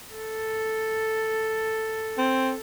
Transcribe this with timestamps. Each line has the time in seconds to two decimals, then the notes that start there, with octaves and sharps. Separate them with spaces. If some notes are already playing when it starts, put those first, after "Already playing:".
0.14 A4
2.18 C4